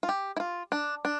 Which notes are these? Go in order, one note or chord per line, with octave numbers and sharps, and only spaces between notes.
F4
G4
E4
F4
D4
D4